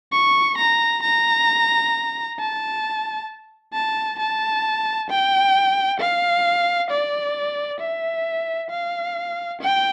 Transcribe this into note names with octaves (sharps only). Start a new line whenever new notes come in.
C#6
A#5
A#5
A5
A5
A5
G5
F5
D5
E5
F5
G5